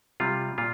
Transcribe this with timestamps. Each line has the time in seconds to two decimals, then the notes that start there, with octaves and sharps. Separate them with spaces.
0.20 C3 G3 F4
0.58 A#2 F4